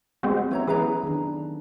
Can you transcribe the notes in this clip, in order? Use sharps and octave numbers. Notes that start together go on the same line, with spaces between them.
G#3 B3 C4 F#4 G4
F#3 B3 C#4 E4 C#5 A#5
E3 G#4 B4 A#5
D#3 D4